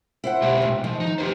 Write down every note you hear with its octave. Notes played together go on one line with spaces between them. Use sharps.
E4 C5 F#5
B2 G#3 G4
A2
D#3 F3
D#4
G4 B4 C5